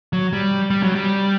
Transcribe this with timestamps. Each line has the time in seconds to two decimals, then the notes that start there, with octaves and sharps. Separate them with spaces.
0.13 F#3
0.33 G3
0.70 G3
0.83 F#3
0.95 G3